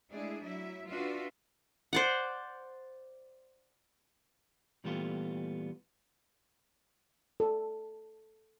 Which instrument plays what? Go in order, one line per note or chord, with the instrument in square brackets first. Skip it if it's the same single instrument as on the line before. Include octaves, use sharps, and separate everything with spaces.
[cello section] G#3 A3 D4 E4 G#4
F#3 E4 E5
D4 F4 F#4 B4 E5
[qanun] C5 D5 F#5
[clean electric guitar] A#2 E3 G3 A3 B3 F4
[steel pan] A4